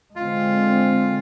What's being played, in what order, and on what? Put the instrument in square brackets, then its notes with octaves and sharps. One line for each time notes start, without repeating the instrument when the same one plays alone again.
[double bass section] D3 G#3 C4 [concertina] F4